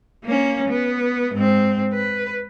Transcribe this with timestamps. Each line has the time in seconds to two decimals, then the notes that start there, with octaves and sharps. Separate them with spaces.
0.24 A#3 C#4
0.68 B3
1.34 G#2 C4
1.93 B4